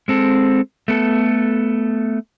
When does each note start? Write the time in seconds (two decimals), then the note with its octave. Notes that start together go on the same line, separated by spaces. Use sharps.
0.08 G#3 C4 A4
0.88 A3 B3 A4